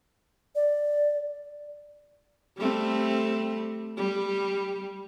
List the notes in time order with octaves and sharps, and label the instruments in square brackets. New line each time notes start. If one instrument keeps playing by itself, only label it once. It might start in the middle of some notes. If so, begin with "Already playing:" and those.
[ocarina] D5
[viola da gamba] G3 A3 C4
G3